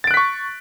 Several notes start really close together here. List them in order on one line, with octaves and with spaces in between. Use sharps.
A6 D7 F#6 B6 C#6